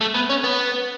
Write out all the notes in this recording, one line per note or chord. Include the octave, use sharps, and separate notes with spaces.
A3
B3
C#4
B3